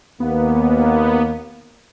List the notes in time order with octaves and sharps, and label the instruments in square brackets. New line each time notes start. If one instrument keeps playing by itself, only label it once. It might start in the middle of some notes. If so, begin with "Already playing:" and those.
[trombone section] D#2 A#3 [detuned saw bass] B3